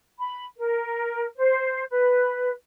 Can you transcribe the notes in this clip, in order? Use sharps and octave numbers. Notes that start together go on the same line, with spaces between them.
B5
A#4
C5
B4